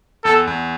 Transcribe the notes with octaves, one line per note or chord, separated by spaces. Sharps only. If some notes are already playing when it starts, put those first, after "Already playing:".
E2 A4
E2